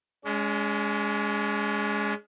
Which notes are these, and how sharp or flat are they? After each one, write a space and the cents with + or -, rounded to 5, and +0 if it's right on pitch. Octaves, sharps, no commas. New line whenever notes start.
G#3 +0 C#4 +40